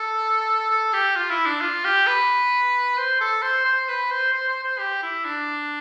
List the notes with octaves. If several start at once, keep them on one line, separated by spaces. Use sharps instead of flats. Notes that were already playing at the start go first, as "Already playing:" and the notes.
Already playing: A4
A4
G4
F4
E4
D4
F4
G4
B4
C5
A4
C5
C5
B4
C5
C5
C5
C5
G4
E4
D4